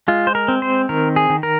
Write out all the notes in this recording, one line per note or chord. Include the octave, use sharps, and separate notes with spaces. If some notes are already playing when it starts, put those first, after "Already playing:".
G#3 F4
C5
A#4
C4
C5
D#3 A#4
G#4
D#3
A#4